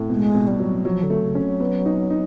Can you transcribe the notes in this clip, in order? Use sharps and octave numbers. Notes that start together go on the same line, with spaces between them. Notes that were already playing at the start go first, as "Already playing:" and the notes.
Already playing: A2
B2 G#3
B2
G3
F#3
F3 F#3
D3
A3
C#3
C#4
F#3
B3
D#4
D#4